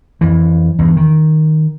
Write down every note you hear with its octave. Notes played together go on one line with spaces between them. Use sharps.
F2 E3
E2 G2
D#3